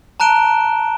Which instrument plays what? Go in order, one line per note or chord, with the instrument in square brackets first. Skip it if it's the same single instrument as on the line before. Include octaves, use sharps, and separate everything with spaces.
[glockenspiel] A5 A#5 F#6 D7 E7 G7